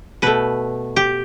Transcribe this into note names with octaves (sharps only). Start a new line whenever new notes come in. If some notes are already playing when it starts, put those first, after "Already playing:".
B2 A3 B4
G4